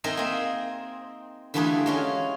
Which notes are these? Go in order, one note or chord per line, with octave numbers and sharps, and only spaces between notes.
C4 D#4 G#4 A#4 D#5 E5
A#3 C4
D3 E3 G3 A3 F4 G#4
G#3 C#4 F4